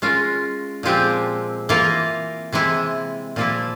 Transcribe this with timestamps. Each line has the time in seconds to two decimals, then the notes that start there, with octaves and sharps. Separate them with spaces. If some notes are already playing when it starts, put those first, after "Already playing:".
0.02 G#3 C#4 F4 A#4
0.83 A#2 F3 G#3 C4 G4
1.69 E3 A#3 F4 A#4
2.52 C3 E3 G#3 E4
3.36 A#2 F3 A#3 E4